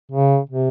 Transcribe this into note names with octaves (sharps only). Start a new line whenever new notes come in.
C#3
C3